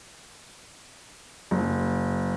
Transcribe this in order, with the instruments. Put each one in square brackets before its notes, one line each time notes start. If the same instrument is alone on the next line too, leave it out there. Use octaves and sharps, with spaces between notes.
[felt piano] F#1